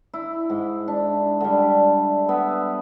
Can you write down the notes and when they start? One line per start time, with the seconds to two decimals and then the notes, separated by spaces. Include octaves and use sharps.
0.14 E4
0.50 G#2
0.88 D4
1.40 D3 G3
2.29 B3 E5